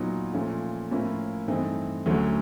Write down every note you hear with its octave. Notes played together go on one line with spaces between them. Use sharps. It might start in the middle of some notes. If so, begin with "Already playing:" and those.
Already playing: A#2 F#3 B3 D#4
A#2 F3 A3 C#4
A2 F3 A#3 C#4 E4
G2 E3 A3 C4 D#4
D2 D3 F#3 A3 C#4